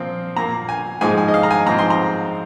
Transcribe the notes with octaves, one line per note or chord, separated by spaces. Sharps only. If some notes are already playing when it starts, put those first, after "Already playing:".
Already playing: A#2 F3 C4
A#2 A#3 A#5
G#5
G#2 F3 G#3 G#5
G#5
D#5
F5
A#5
G#5
G#2 F3 C4 A#5
C6
A#5